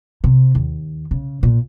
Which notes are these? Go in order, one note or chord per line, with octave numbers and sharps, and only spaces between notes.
C3
D#2
C#3
A#2